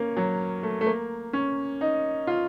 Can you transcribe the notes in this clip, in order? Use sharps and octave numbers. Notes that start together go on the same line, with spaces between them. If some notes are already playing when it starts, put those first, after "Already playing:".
Already playing: A#3 C#4
F#3
A3
A3
A#3
C#4
D#4
F4